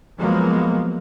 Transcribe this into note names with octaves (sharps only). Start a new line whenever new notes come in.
F3 F#3 G#3 A#3 B3